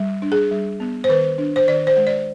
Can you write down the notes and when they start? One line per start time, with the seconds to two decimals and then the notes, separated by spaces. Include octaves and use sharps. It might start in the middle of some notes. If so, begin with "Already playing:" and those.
Already playing: G3
0.22 D4
0.32 G#4
0.51 G3
0.80 B3
1.04 C5
1.09 D#3 B4
1.38 D4
1.56 C5
1.68 D#3 D5
1.87 C5
1.97 G#3
2.07 D5